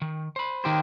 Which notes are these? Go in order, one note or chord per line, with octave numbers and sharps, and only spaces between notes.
D#3
C5 B5
D#3 G4 C5